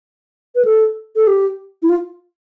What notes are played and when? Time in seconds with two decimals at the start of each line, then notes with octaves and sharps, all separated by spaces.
0.55 B4
0.65 A4
1.16 A4
1.27 G4
1.82 E4
1.89 F4